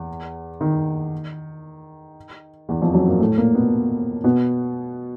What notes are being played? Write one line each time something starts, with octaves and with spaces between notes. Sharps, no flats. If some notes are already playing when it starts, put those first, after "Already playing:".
Already playing: E2
D#3
E2 E3
F2 F3
F#2 F#3
A#2 A#3
A2 A3
A#2 A#3
B2 B3
B2 B3